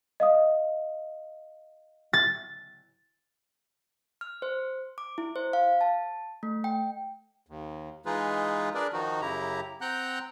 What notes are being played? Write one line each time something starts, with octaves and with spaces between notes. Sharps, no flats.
D#5 F5 D#6
A6
F6
C5
D6
E4
C5
F5
A5
A3
G5
D#2
E3 G#3 D#4 F4 G#4 B4
D4 G#4 A#4 B4 D5
D#3 F3 D#4 F#4
F#2 C#3 E4 G4 A#5
C4 F#5 G5 A#5 F#6 G6